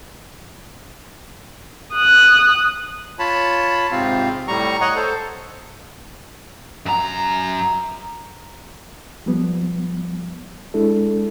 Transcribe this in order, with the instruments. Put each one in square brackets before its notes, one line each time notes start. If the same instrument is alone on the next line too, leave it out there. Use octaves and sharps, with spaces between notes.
[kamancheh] D#6 F#6
[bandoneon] F4 C#5 A5 B5
G#2 C3 C4 F4 F5
A2 G3 A#5 C#6
C#5 D#5 F#5 A#5 C#6
A4 C5
[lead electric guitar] F#2 A#5
[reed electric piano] F3 G3 B3
G#3 D4 E4 A4